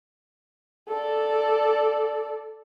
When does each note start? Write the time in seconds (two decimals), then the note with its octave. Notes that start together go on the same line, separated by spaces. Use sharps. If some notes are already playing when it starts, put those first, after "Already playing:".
0.88 A4 D5